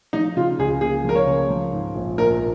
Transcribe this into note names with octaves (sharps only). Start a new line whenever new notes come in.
F3 D#4
C#3 F4
C#2 G#4
A#3 G#4
F3 A#4
C#5
C#3
F3
G#2
A#1
A#1 A#4